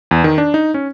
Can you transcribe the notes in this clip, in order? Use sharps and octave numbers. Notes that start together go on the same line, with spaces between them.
E2
D#3
D4
D#4
C#4